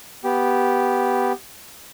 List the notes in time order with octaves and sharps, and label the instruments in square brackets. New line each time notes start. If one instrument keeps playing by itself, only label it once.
[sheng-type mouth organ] B3 G4